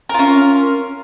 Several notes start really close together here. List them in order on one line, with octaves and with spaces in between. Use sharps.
A#4 F4 C#4